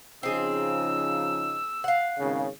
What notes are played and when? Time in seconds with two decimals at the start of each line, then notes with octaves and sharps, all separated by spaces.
0.23 C#3 F3 C4 D#4 G#4 E6
1.84 F5 F#5
2.19 G#1 C#3